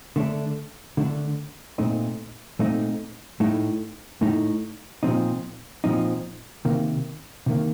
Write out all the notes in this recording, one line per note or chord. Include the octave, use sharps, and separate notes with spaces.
D3 A3 D4
D3 A3 D4
A#2 A3 C4 D#4
A#2 A3 C4 D#4
A2 A3 D#4
A2 A3 D#4
A#2 F3 C4 D#4
A#2 F3 C4 D#4
C3 D#3 A#3
C3 D#3 A#3